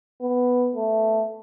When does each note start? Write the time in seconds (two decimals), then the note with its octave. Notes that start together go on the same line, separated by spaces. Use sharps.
0.22 B3
0.76 A3